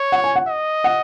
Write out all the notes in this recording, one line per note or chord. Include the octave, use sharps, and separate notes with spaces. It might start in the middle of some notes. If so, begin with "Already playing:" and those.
Already playing: C#5
F#5
G#5
F#5
D#5
F#5